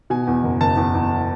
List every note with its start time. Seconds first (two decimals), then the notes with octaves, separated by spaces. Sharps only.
0.10 B2 G#5
0.27 E2
0.43 F#1
0.60 F#1 A5
0.77 E2
0.94 E2